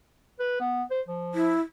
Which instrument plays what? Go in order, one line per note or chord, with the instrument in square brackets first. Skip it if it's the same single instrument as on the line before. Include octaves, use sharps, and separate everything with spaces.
[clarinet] B4
B3
C5
F3
[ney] E4